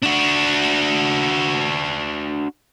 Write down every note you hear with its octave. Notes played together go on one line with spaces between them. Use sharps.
D4 F#4